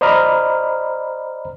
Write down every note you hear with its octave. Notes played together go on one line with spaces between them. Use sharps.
C5 D5 D#5 A#5 B5 F6